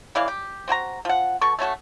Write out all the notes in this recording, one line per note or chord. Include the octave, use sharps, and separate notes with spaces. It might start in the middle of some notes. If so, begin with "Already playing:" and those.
C#3 E3 D5 F5
G4
C4 F#4 G5 A#5
F3 F#5
B2 A4 A5 C#6
A3 C#4 F#4 A4